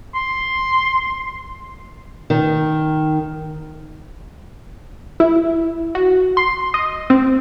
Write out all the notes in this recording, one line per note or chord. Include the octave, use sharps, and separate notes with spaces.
C6
D#3
E4
F#4
C6
D#5
C4